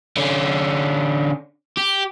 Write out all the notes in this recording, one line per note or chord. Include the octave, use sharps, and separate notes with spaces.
D3 C#4
G4